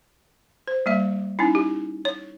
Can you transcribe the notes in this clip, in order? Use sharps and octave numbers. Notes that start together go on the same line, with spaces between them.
C5
G3 A#3 E5
C#4 D#4 E4
G4
C#5